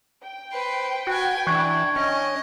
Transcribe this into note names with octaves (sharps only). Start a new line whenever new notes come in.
G5
B4 C5
F#4 B4 G#5
E3 D4 C#6 F#6 G#6
C#4 D#5